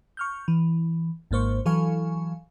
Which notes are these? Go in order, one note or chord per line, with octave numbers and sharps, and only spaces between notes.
C#6 F6 G6
E3
G#1 G#2 A#3 C5 C#6
E3 F#3 A4 F5 G#5 C#6